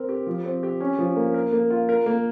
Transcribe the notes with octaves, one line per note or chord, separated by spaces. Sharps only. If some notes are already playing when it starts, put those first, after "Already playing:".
Already playing: C4 A#4
G4
F3
C4
G4
C#4
F3
A#3
A#4
A#3
F4
A#4
A#3